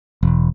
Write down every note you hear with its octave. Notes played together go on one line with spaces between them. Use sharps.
E1